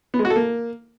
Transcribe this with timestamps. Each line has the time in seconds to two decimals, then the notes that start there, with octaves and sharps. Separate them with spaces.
0.14 B3
0.19 G#3
0.25 F#4
0.30 A4
0.36 A#3